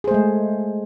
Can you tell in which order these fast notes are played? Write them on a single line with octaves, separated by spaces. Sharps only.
G#4 C5 A3 G#3